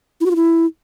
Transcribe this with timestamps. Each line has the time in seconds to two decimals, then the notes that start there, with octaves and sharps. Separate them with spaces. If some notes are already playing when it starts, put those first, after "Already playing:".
0.21 E4
0.26 F#4
0.31 F4
0.36 E4